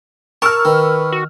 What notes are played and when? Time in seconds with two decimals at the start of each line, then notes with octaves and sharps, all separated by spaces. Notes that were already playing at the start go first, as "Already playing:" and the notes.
0.42 A#4 A5 C#6 E6 F6
0.65 D#3 B4
1.12 F#4